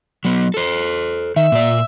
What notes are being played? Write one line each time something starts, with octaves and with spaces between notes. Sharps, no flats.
F#3 B3
A4 C5
D#3 E5
A#2 D5